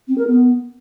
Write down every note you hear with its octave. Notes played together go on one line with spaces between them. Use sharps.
C4
A#4
B3